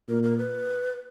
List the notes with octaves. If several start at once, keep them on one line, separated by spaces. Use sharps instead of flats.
A#2 A#4
A#4
B4